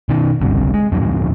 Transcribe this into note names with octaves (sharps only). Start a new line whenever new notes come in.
B2 D#3
G1 C#2 G2 C3
G#3
D1 F2 G#2 F#3